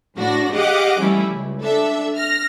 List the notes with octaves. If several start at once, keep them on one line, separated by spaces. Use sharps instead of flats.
A2 D4 F#4 A#6
G4 G#4 D#5 F5 F#5 D6
E3 G3 A3 C#4 E4
C#2
D4 A4 E5
F6 A#6